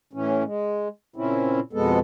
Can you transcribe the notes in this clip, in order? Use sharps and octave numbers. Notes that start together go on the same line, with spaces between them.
A2 E3 C#4
G#3
A#2 C#3 C4 C#4 E4
F2 B2 G#3 B3 A4